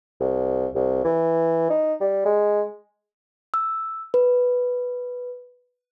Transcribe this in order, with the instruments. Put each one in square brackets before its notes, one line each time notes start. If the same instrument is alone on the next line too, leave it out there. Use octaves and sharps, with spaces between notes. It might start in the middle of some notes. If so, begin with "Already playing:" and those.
[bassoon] C2
C2
E3
D#4
G3
G#3
[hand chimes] E6
B4